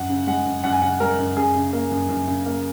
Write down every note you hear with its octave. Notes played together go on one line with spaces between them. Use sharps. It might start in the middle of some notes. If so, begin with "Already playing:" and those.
Already playing: F#2 F#5
C#3
G#3 F#5
F#2
F#2 F#5
G#5
C#3 F#5
G#3 A#4
F#2
F#2 G#4
C#3
A#3
F#2
F#2
C#3
A#3